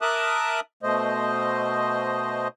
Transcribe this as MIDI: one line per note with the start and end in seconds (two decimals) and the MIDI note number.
0.02 0.60 70
0.02 0.60 76
0.02 0.60 81
0.02 0.60 86
0.02 0.60 87
0.02 0.60 90
0.83 2.48 47
0.83 2.48 57
0.83 2.48 72
0.83 2.48 75